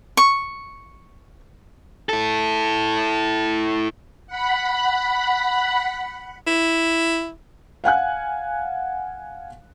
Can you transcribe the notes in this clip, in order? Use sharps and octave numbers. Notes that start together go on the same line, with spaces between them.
C#6
E4 A4
F#5 B5
E4
F5 F#5 G#5 F#6